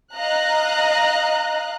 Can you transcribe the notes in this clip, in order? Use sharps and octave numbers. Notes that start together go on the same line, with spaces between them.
D#5 F5 A#5 F#6